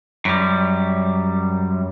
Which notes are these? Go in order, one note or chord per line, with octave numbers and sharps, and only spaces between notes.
F#2 G3